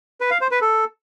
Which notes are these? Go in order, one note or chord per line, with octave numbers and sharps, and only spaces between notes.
B4
F5
C5
B4
A4